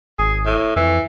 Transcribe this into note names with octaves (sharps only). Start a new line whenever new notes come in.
G#1 G#4
A2
F2 E3